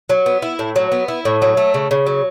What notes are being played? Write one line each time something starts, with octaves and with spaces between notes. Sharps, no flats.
F#3
B3
E4
A2
F#3
B3
E4
A2
F#3
A3
C#3
C#3
F#3